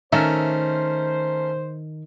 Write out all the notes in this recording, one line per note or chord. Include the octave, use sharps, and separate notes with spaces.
D#3 A3 C#4 A#4 C5 E5